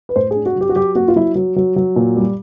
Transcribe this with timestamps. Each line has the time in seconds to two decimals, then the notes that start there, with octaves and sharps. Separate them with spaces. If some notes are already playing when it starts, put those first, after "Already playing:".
0.09 B4
0.16 A2 C5
0.31 D4 G#4
0.46 F#4
0.56 F#3 G4
0.69 F#4
0.76 F#3 G4
0.95 A#3 F#4
1.08 F4
1.16 F#3 E4
1.35 F#3
1.56 F#3
1.76 F#3
1.96 A#2
2.17 G3